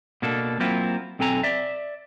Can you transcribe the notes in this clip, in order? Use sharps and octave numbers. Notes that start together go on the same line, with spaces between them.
B2 A#3 D4 A4
F#3 A#3 C4 E4 F4
B1 C4 A4 G#5 A#5
D5 E5